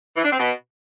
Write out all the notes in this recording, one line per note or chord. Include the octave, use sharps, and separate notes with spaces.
E3
D4
C4
B2